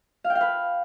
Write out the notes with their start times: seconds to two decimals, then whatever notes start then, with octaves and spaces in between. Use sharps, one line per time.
0.24 F5
0.30 G5
0.35 F5
0.41 B4